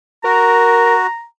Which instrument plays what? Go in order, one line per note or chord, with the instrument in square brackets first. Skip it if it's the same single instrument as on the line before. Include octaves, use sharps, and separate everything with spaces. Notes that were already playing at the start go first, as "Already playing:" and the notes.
[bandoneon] F#4 [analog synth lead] A#4 [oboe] A#5